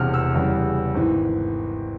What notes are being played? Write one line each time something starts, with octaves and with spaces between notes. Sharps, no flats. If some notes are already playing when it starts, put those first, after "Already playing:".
Already playing: E1 E2 C3 F6
E6
E2 C#3 G3
G#1 E3